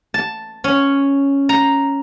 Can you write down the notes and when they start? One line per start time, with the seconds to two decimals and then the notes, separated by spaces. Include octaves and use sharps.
0.14 A5
0.64 C#4
1.49 A#5